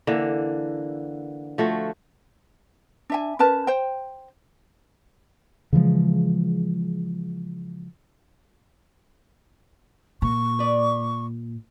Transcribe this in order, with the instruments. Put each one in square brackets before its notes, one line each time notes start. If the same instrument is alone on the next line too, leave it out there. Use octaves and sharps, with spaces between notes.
[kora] D3 E3 A#3
F3 A3 F#4
[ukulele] D4 E5 G#5
C#4 A#4 B4 A5
C5 G5
[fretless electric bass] C#3 E3 F3 G#3
[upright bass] A#2 [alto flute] C#6
[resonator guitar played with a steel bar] B4 D5